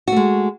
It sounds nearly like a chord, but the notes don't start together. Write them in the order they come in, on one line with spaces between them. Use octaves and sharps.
F#4 A3 G#3